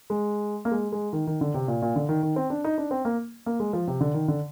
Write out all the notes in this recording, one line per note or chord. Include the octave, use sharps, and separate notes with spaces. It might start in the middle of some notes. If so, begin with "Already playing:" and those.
G#3
A#3
G#3
G#3
D#3
D#3
D3
C3
A#2
A#2
D3
D#3
D#3
C4
D4
D#4
D4
C4
A#3
A#3
G#3
F3
C3
D3
D#3
D3